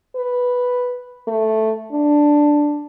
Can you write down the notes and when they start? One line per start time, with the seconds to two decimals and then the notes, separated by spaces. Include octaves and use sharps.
0.16 B4
1.28 A3
1.92 D4